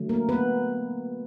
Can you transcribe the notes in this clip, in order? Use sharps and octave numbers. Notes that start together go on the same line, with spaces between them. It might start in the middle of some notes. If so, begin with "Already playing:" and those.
Already playing: D3 F#3 A3
A#3 A#4
B3 B4